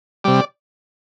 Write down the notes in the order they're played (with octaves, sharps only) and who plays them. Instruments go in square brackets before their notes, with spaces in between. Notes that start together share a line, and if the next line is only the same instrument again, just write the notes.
[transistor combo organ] C3 G3 D5